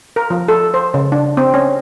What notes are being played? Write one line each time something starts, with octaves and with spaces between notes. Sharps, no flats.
A#4
F3
A4
C5
C#3
D4
C4
C#4